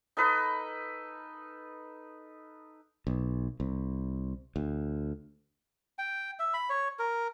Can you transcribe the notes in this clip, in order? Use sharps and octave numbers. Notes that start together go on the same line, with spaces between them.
D#4 A4 B4 D#5
B1
C2
D2
G5
E5
B5
C#5
A#4